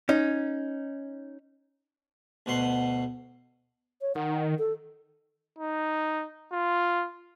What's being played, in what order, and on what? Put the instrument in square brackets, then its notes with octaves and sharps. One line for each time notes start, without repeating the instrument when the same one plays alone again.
[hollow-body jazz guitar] C#4 D#4
[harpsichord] D2 B2 F#5 C6
[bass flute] C#5
[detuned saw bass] D#3 [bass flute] F#5
[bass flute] A4
[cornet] D#4
F4